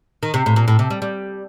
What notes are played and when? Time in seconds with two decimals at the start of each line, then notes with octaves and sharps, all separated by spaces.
0.23 D#3
0.34 C3
0.46 A2
0.56 A#2
0.68 A2
0.79 C3
0.90 G3
1.02 G3